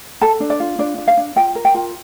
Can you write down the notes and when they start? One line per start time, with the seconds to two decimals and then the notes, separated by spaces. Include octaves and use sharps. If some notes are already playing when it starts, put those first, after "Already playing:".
0.21 A4 A5
0.40 D4
0.50 D5
0.60 F4
0.79 D4 D5
0.98 D4
1.08 F5
1.17 D4
1.36 F4 G5
1.55 A#4
1.65 G5
1.74 F4